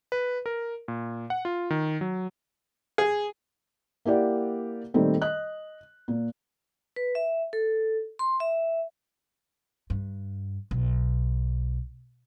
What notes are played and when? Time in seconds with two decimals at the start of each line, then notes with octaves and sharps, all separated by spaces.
0.12 B4
0.46 A#4
0.88 A#2
1.30 F#5
1.45 F4
1.70 D#3
2.01 F#3
2.98 G#4
4.05 A#3 E4 G4 D5 F#5
4.94 A#2 D#3 G3 A3 C4
5.22 D#5 F#6
6.08 A#2
6.96 B4
7.15 E5
7.53 A4
8.19 C6
8.40 E5
9.90 G2
10.71 B1